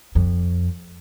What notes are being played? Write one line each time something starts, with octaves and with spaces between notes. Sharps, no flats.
F2